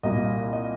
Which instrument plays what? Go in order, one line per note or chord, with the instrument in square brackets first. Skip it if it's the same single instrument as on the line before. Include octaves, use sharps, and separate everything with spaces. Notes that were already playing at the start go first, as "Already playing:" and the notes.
[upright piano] C2 A#2 G3 A#3 D#5
D#5